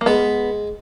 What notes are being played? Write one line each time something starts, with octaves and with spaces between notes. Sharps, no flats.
A#3
G#3 B3